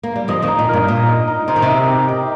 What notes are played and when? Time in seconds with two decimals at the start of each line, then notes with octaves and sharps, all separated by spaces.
0.03 A#3
0.16 G3
0.28 F2 F3 D#5
0.42 D#2 D#3
0.48 D#4
0.59 A#2
0.69 G2 A#4
0.88 A#2 D#4
1.08 D#5
1.28 D#4
1.48 C3 C5
1.56 D#3
1.62 C3
1.69 D#4
1.89 G4
2.09 D#4